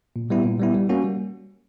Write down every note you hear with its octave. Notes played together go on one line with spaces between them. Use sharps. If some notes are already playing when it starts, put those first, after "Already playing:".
A#2
G3 B3 E4
A#2
G3 B3 E4
G3
A#3 C#4 F#4
G3